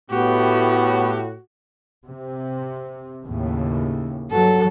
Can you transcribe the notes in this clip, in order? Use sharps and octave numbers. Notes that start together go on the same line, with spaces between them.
A2 B3 F#4 G4
C3
D#2 A2 C#3
G2 F#3 A4